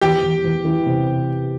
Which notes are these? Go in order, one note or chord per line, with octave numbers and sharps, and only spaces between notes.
E2 G4 G5
E2
E2
E3
C3